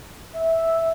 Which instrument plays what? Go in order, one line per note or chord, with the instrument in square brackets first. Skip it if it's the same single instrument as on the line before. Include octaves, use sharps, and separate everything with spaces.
[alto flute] E5